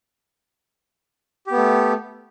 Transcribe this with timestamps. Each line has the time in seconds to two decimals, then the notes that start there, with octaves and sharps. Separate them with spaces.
1.47 G4
1.52 B3
1.57 A3